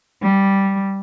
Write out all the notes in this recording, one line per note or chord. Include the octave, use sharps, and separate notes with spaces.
G3